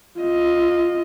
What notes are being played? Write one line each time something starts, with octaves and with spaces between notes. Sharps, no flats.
F4 D#5